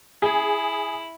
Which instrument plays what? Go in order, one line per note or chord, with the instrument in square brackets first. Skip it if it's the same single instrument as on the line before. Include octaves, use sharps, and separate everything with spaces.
[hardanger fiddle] E4 [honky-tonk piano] G#4